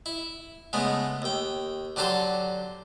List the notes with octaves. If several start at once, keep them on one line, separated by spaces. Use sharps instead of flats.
E4
C#3 G#3 A3 B3
D#2 G5
D3 F#3 G4 A4 C5